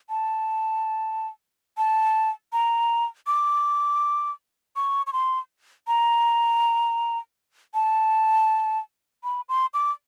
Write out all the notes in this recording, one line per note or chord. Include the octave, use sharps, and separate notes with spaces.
A5
A5
A#5
D6
C#6
C#6
C6
A#5
A5
B5
C6
D6